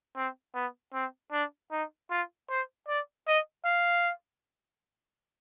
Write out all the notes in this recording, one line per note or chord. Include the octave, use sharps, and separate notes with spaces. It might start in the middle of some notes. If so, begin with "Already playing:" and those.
C4
B3
C4
D4
D#4
F4
C5
D5
D#5
F5